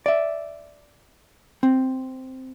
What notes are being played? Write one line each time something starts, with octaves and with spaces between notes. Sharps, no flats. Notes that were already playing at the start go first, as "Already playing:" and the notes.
D5 E5
C4